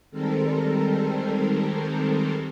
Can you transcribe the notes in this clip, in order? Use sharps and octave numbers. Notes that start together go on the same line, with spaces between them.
D#3 G3 G#3 C4 A4 A#4